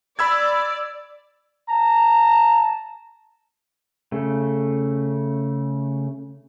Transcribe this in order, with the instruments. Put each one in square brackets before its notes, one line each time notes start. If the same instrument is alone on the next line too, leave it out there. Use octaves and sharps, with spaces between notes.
[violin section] D5 [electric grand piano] B5 E6 G#6
[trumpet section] A5 A#5
[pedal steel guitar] C#3 A3